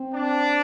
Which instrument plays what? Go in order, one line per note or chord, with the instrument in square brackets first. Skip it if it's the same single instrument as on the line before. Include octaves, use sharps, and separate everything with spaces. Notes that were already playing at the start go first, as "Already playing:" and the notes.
Already playing: [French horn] C4
[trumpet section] D4